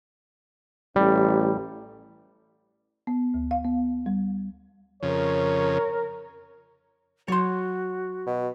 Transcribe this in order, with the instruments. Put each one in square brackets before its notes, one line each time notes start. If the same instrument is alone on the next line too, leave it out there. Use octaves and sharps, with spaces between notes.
[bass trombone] A1 [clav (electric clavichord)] G3
[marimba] B3
D2
F5
B3
G3
[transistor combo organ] F2 C#3 [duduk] A#4 [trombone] C#5
[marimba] F#3 [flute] F#4 [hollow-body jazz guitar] C#5 C6
[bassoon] B2